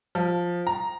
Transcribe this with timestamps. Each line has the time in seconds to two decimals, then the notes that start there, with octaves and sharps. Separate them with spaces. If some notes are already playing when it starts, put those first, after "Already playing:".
0.15 F3
0.67 A#5